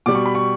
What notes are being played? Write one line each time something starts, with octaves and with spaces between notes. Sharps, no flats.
B2 G3 D6
C#6
B5
C#6